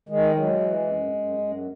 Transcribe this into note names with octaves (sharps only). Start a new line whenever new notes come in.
D#3 G#3
F#3 G#3
E3
F#2
F#2
F#2